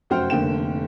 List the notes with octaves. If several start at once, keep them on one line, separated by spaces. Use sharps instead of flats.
F1 F#2 F#4 C5 G5 F6
F1 D3 A#3 G5 E7